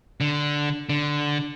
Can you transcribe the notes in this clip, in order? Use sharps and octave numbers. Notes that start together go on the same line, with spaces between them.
D3
D3